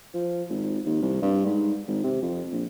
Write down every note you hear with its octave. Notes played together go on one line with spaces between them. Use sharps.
F3
G#1
D#2
C2
G2
G#2
G#1
C3
F2
A#1